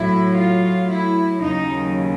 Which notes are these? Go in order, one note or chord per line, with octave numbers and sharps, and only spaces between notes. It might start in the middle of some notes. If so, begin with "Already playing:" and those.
Already playing: A2 F#3 E4
F4
E4
D#2 C#3 F#3 D#4